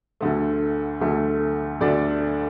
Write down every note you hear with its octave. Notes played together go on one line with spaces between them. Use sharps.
D2 D3 A3
D2 D3 A3
D2 D3 A3 D4 D5